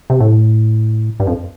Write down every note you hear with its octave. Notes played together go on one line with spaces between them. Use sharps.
C3
A2
G2
F2